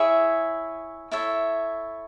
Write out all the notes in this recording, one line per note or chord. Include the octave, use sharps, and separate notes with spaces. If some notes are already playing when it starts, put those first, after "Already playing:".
Already playing: E4 G#4 C#5 E5
E4 A4 C#5 E5